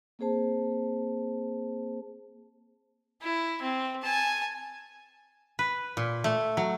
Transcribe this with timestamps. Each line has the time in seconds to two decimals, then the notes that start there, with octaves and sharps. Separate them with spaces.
0.19 A#3 C4 G#4 C5 A5
3.21 E4
3.61 C4
4.02 G#5 A5
5.59 B4
5.97 A#2
6.24 A3
6.57 F#3